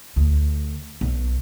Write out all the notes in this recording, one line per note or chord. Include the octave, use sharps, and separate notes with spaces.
D2
B1